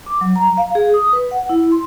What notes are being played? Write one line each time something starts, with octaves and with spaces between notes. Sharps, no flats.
D6
F#3
A#5
F5
G#4
D#6
B4
F#5
E4
C6